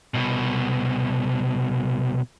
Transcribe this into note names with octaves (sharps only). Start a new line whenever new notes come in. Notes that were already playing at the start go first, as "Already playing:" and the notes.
C2 B2